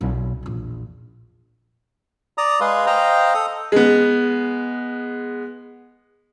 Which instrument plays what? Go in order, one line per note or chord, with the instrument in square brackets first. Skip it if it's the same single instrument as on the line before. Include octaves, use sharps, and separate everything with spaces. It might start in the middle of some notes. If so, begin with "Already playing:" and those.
[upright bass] B1
A#1 E2
[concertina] D5 A#5 D#6
G#3 G#4 B4 F5 C6
C5 D#5 F5 G5 A#5
A4 D#6
[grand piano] G#3 B3